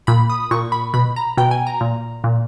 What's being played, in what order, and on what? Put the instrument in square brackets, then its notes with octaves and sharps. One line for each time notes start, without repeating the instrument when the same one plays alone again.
[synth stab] A#2 B5
D#6
A#2 C#6
B5
B2 B5
A#5
B2 G5
G#5
A#5
A#2
A#2